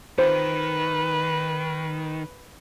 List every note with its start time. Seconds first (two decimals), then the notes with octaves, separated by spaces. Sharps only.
0.19 D#3 B4 C5